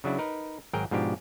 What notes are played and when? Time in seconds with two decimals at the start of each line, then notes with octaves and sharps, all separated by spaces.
0.04 C#3 F#3 D4 E4
0.18 D#4 A#4 B4
0.73 G#1 F#3 G#4 A#4 G5
0.91 G#2 B2 F3 D4 G4